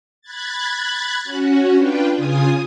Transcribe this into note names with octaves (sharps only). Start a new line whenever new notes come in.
B5 F#6 G#6 A6
C#4 F#4
D4 F4 B4 G5
C#3 F4 G#5 D#6